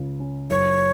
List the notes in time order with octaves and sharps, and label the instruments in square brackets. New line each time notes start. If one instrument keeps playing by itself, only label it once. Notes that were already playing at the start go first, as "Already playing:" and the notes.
Already playing: [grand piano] C#2 C#3
C#4
[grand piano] F#1 [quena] C#5